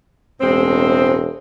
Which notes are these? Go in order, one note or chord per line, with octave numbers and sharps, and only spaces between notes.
E1 A2 G#3 C4